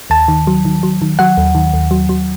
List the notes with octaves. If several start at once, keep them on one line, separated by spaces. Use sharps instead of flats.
D#2 A5
D#3
F#3
D#3
F#3
D#3
F#3 F#5
D#2
D#3
D#2
F#3
F#3